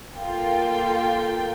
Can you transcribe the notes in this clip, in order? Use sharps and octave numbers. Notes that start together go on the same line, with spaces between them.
A#3 F4 A4 G5